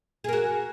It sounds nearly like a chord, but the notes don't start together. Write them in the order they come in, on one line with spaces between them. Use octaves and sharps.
G#4 A#4 F#4